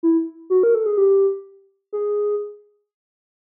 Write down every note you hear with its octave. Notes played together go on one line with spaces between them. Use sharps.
E4
F#4
A#4
A4
G#4
G4
G#4